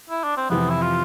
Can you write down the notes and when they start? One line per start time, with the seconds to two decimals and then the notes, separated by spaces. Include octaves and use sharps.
0.10 E4
0.24 D4
0.37 C4
0.50 F2 C3 E3 B3
0.70 E4
0.82 F4